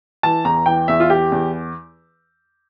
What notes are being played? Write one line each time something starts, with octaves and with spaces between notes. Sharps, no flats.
E3 A5
E2 A#5
E3 G5
E2 E5
F4
E3 G4
E2